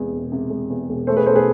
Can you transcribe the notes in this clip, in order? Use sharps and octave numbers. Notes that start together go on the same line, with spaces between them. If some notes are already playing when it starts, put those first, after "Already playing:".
Already playing: E2 C3 G#3
E1
C3
G#3
E2
E1
A3 A4 C5
G#4 B4
B1 A4 C5
G#4 B4